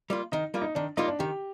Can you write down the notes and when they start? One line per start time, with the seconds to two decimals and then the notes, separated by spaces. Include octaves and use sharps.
0.10 G3 A#3 F4
0.32 D#3 D#4
0.54 G3 A#3 F4
0.62 D#4
0.75 D#3 D4
0.97 G3 A#3 D#4 F4
1.08 D4
1.19 D#3 G4